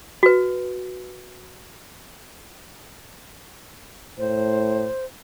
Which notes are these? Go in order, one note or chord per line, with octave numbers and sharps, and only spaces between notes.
F#4 B4
A2 C5